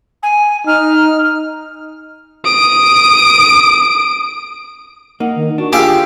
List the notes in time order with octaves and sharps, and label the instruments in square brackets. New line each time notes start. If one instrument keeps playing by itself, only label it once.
[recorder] G#5
[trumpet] D#4 [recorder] F6
[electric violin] D#6 D7
[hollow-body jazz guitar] A#3 D#4 [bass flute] F#5
[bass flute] D#3
[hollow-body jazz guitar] D4 [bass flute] F#4
[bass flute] F4 [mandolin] G4 [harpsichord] G#4 E5 F5